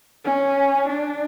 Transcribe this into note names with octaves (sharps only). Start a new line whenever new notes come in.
C#4
D4